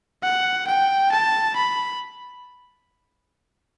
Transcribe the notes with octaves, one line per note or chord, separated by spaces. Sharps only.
F#5
G5
A5
B5